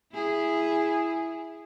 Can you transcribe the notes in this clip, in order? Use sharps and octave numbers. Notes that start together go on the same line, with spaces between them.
E4 G#4